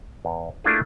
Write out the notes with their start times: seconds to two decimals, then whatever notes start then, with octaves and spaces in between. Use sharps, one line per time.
0.25 E2
0.64 A3 A#3 D4 E4 F4 G#4